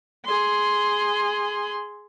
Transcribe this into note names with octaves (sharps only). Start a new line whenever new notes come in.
G#4 C6